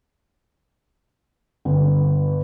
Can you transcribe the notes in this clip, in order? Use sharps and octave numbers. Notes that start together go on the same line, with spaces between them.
G1